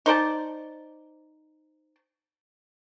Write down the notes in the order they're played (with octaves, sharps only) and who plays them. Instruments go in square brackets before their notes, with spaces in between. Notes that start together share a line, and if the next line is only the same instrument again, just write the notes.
[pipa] D#4 C5 D5 A5